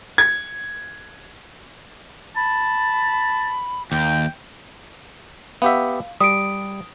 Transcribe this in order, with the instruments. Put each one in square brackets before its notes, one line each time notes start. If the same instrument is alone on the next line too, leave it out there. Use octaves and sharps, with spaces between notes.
[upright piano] G#6
[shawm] A5 [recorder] B5
[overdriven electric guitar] D#2 [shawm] G5
[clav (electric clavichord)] B3 G4 E5 [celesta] F5
[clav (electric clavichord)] G3 [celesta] D#6 D7